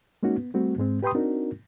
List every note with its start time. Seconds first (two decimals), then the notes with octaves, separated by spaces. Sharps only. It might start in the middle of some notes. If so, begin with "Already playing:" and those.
0.23 G#3 A#3 C#4 D#4 F#4
0.37 B3
0.54 G3 A3 C4 F#4
0.78 G#2 G#3 C4
1.03 G4 B4 G5 B5 C6 D#6
1.14 C4 D4 D#4 F#4 A#4